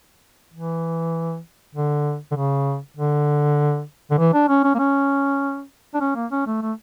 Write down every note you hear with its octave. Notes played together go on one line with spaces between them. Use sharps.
E3
D3
D3
C#3
D3
D3
E3
D4
C#4
C#4
A#3
C#4
D4
C#4
A#3
C#4
A3
A3